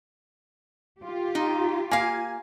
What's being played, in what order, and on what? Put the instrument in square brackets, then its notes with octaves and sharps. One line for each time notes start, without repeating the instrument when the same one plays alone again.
[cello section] F4 G4
[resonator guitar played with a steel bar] D#4
[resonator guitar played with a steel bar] A#3 F5 [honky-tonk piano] G#5